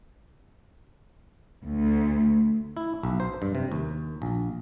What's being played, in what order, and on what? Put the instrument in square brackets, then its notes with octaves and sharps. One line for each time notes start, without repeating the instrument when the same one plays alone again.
[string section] D2
[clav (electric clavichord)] E4
B1
C5
G2
C3
D#2
A#1